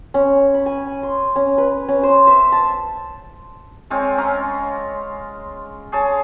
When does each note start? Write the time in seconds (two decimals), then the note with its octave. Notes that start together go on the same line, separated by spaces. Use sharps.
0.14 C#4
0.54 B5
0.66 G#5
1.03 C6
1.36 C#4
1.58 B4
1.88 C#4
2.03 C5
2.27 E5
2.52 A5
3.90 G#3 C4 F4 C#5
4.18 C#4 F5 A#5
5.92 G#4 C#5 A5